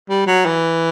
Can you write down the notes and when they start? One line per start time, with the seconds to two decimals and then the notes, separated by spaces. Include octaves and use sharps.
0.09 G3
0.27 F#3
0.46 E3